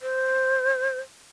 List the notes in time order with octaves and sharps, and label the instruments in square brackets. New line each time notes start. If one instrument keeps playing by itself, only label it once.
[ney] C5